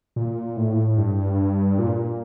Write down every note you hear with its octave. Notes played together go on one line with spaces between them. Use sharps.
A#2
A2
G2
A#2